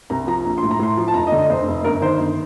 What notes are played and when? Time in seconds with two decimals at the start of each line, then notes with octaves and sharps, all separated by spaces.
0.10 C2 A#5
0.27 F3 A#5
0.44 A#1
0.58 A2 C6
0.71 A#5
0.79 A2 C6
0.97 F3
1.08 A5
1.14 F1 A#5
1.27 D#5
1.32 D3
1.38 D#5
1.49 F1 C5
1.68 F1
1.84 G1 A#4
2.01 D#3 C5
2.19 G1